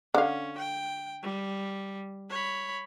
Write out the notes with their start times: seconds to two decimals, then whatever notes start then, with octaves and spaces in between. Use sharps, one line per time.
0.14 D3 C#4 F5
0.58 G5
1.22 G3
2.30 C#5 B5